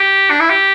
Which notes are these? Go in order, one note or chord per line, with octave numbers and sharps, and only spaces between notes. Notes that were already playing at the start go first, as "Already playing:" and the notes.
Already playing: G4
D4
E4
G4